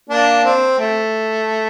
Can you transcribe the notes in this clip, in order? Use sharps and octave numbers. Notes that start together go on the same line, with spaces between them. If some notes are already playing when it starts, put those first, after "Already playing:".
A#3 D4
C4
A3